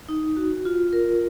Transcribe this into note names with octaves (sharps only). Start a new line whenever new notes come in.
D#4
F#4
F4
A#4